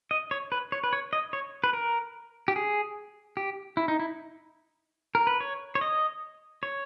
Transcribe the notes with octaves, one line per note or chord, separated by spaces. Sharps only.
D#5
C#5
B4
C#5
B4
C#5
D#5
C#5
B4
A#4
G4
G#4
G4
E4
D#4
E4
A#4
B4
C#5
C#5
D#5
C#5